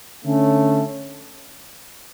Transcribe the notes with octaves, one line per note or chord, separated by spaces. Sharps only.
D3 A3 C#4